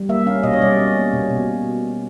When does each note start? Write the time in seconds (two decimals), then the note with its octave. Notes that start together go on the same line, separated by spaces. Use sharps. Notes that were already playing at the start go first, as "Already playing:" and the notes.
Already playing: G3
0.09 A#3 E5
0.26 C#4 F5
0.43 B2 D#5
0.53 C#5
0.62 G3 D5
0.79 C#4
0.97 A#3
1.13 B2
1.31 B2